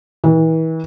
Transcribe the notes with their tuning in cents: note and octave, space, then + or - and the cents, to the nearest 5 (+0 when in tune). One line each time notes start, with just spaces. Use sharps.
E3 -35